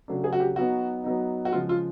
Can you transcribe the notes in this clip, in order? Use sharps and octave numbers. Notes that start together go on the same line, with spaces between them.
C#3 F#3 A3 D4
G#4
F#4
G4
F#3 B3 D#4 F#4
F#3 B3 D#4
F#4
C#3 F3 G#3 F4
F4